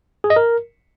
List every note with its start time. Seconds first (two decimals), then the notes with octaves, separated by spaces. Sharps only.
0.24 G#4
0.30 D#5
0.36 A#4